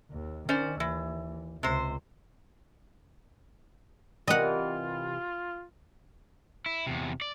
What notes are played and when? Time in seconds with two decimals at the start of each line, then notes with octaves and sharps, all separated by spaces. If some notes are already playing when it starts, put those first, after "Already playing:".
0.11 D#2
0.49 D#3 C#4 C5 D5
0.80 D#2 E3
1.63 C#2 C3 C5
4.27 C3 E3 F4 A#4 D#5 F#5
6.66 E4
6.87 E2 C3
7.21 D5